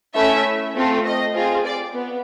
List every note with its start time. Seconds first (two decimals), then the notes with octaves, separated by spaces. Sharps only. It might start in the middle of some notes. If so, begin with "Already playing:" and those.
0.15 A3 C#4 E4 E5
0.75 A3 C4 F4 A4
1.05 D#5
1.34 C4 F4 G#4
1.64 D5
1.94 B3